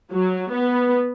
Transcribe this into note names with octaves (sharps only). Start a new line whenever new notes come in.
F#3
B3